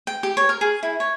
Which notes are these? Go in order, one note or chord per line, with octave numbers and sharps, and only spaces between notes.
G5
G4
C#5
A#4
G#4
E4
C#5